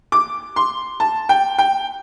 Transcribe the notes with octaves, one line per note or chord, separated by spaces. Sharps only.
D6
C6
A5
G5
G5